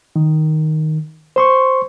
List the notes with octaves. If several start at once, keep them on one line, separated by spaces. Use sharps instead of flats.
D#3
C5 C6 C#6